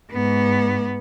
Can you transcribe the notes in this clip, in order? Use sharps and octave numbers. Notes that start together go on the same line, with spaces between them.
G#2 B3